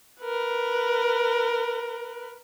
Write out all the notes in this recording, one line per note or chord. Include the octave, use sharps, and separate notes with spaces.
A#4 B4